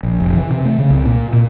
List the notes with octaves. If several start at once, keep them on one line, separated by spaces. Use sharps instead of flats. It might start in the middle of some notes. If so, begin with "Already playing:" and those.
A#1
F1
E3
C3
A3
C#3
C2
A#2
A#2